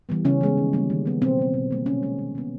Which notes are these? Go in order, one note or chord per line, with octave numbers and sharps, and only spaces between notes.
E3 G3 B3
C#3 C#4
E3 G#3 B3
D#3
G3 A#3
D#3
F#3 B3
B2 C4
F#3 B3
B2
G3 A#3
C3 C#4
D#3 G#3 C4
D#3
G#3 B3